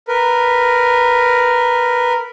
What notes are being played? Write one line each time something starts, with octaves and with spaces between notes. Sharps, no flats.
A#4 B4